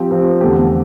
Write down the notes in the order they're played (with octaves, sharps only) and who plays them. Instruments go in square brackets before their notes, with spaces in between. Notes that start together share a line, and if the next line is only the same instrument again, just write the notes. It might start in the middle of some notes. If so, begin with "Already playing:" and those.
Already playing: [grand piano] F3 C4 G4
F3 C4 G4
E2 D3 A3 C4 G4